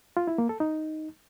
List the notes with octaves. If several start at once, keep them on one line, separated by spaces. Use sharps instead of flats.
F4
E4
A#3
A4
D#4